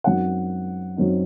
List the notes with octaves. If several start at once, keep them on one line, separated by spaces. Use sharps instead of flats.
F#2 F#3 C4 D#4 F#5
F#2 F#3 C4 D#4